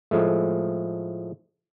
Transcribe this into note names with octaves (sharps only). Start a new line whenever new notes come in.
A2 F3 G#3 A3